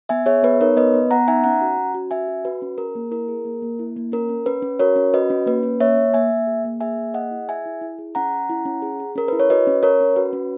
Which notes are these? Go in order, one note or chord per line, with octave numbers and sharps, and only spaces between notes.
B3 E5 G#5
G#4 C#5 E5
B3 B4
D#4 A#4 C#5
B3 B4 D#5
B3
B3 F#5 A#5
D#4 E5 G#5
C#4 F#5 A#5
F#4
C#4
F#4
C#4 E5 G#5
F#4
F#4 B4
C#4
G#4 A#4
A#3
E4 A#4
G#4
A#3
A#3
E4
A#3
C#4 A#4
C#4
C#4 B4
C#4
F#4 A#4 C#5
C#4
F#4 B4 D#5
C#4
A#3 B4
C#4
A#3 C#5 E5
A#3
A#3 E5 G#5
A#3
G#4
A#3
G#4 E5 G#5
A#3
G#4 D#5 F#5
E4
G#4 E5 G#5
E4
E4
G#4
C#4 F#5 A#5
C#4
E4
C#4
G#4
G#4
C#4 A#4
E4 B4
C#5
F#4 B4 D#5
C#4
C#4 A#4 C#5
C#4
F#4 B4
C#4